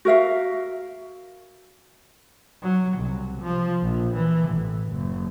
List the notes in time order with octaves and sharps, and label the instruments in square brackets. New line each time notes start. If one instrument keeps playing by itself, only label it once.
[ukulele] F#4 A#4 E5 F5
[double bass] F#3
C2
F3
A#1
E3
A1
F#1